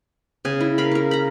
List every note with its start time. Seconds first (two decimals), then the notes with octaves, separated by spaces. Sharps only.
0.45 C#3 G#5
0.60 E4
0.78 A#4 F5 B5
0.91 C#4 A#4
1.11 A#5 B5